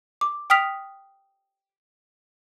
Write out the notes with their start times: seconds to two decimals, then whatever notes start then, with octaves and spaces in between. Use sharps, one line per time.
0.21 D6
0.50 G5 D#6 F6 B6 F7